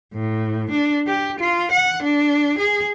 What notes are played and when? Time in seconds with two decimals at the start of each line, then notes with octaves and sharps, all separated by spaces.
0.14 A2
0.71 D4
1.07 G4
1.39 F4
1.71 F#5
2.03 D4
2.58 G#4